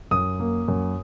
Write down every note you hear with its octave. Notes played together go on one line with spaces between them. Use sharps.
F#2 D#6
A#3
F#2